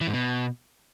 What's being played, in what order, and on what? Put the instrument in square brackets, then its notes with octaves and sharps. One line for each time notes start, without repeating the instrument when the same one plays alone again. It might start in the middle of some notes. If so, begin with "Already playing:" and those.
[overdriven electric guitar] E3
G#2
B2